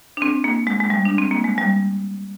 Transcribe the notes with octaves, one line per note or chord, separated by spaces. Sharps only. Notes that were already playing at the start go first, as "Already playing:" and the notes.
D4
C4
A#3
G#3
G#3
G3
D4
C4
A#3
G#3
G3